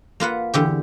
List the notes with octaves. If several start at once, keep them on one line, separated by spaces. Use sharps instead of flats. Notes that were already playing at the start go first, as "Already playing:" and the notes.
A#3 F4 B4 F#5
E2 D3 G4